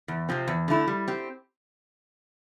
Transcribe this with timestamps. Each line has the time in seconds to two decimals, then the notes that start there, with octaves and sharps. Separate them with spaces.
0.08 E2
0.29 C3 F3 C4
0.48 E2
0.68 D3 A3 E4
0.87 G3
1.08 C4 G4